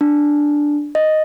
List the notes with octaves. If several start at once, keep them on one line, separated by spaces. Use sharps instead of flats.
D4
D#5